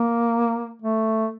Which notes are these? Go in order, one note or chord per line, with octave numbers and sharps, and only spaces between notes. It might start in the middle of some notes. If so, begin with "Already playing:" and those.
Already playing: A#3
A3